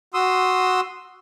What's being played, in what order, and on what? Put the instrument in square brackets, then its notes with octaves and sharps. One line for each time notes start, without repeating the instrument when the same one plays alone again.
[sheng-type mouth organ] F#4 C6 D#6 E6